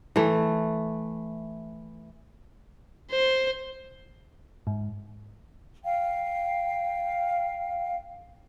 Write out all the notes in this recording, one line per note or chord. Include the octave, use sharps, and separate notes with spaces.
E3 A3
C5
G#2
F5 G5